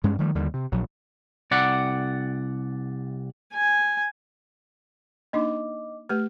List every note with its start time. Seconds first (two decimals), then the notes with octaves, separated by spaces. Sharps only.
0.04 G2 G#3 C#4
0.19 D#3 F3 G3 A3
0.35 D#2 D3 D#3 G3
0.54 C3
0.72 A#1 F#3
1.51 C2 D5 F#5
3.54 G#5
5.33 A#3 D4 D#4 D#5 D6
6.09 A3 G4 B4 F6